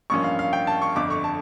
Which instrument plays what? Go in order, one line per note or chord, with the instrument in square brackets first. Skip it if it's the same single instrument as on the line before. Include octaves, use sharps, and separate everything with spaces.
[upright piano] A1 G2 F3 A#3 C#4 C#6
F5
F5
G5
A5
C#6
G1 F2 D3 D6
C#6
A5